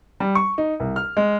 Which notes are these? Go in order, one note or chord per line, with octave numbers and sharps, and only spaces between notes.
G3
C#6
D#4
C2
F6
G#3